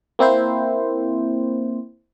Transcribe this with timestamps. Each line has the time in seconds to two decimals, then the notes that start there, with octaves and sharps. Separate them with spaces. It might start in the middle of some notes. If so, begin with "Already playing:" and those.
0.19 A#3 C4 E4 C5